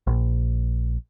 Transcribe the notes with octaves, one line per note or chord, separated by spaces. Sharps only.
A#1